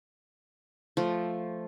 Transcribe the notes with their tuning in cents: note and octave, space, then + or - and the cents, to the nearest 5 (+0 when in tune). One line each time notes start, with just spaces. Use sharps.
F3 +0 A3 +0